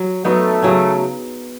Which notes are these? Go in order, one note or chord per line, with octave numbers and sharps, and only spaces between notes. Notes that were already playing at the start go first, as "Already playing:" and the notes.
Already playing: F#3 F#4
F#3 A3 B3 D#4
C#3 F#3 C#4